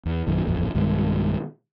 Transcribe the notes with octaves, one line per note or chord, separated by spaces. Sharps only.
E2
A#1 F#2 D#3
D#1 A1 F2
B1 G2 D#3 G#3